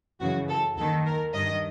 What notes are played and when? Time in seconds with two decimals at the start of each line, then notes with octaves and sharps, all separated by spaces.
0.21 F#2 C#3 E3 F#4
0.49 A4
0.77 D#2 A4
0.82 D#3
1.06 A#4
1.33 G2 D#3 D#5